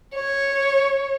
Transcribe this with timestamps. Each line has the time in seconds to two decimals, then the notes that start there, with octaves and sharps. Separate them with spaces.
0.14 C#5